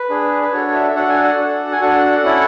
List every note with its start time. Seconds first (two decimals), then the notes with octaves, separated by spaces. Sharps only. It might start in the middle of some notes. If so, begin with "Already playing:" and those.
Already playing: B4
0.10 D4 G#4
0.43 B4
0.52 D4 F#4 A4 C#5
0.73 E5
0.88 E5
0.95 D4 F#4 A4 F#5
1.09 G#5
1.24 F#5
1.38 D4 F#4 A4
1.72 G#5
1.81 D4 F#4 A4 F#5
2.23 C#4 E4 A4